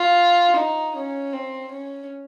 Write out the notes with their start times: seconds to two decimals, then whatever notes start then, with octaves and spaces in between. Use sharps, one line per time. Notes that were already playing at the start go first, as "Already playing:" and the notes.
Already playing: F4
0.56 D#4
0.95 C#4
1.33 C4
1.71 C#4